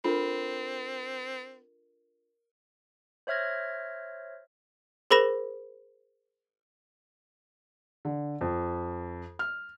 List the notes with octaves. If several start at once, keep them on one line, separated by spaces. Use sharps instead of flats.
C4 D4 F4 A4 A#4 B5
C5 C#5 E5 F6 G#6 A#6
G#4 A#4 C5 B5 A#6 E7
D3
F2
F6